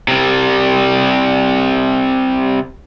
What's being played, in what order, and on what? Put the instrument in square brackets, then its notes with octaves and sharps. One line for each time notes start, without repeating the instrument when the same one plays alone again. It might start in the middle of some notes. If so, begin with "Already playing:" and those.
[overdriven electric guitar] C3 G3